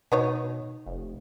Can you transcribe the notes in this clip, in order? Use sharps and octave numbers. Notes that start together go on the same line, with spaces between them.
B2 B3 D#4 C#5
F1